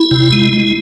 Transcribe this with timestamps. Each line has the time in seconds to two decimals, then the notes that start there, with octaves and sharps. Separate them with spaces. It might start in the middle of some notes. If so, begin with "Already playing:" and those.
Already playing: E4
0.11 C3
0.32 G#3
0.53 G#3